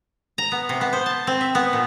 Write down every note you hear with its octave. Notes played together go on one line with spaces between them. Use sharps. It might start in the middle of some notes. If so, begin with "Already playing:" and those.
A#5
B3
C3
B3
C5
A5
C4
E5
B3
A#2